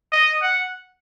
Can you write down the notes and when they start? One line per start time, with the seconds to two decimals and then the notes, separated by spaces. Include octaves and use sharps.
0.12 D#5
0.42 F#5